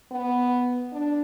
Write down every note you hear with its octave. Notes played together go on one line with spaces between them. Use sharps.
B3
D4